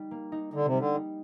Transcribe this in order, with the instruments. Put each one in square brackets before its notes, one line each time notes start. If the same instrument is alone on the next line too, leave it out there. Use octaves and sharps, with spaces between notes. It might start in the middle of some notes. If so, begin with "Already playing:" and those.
Already playing: [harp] G3 D#4
A#3
D#4
[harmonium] D3 [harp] D#4
[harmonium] C3
[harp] G3
[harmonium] D3
[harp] D#4